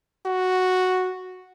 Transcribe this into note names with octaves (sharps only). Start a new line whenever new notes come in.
F#4